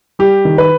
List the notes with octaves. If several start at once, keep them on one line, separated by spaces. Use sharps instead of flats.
G3 G4
D#3
B4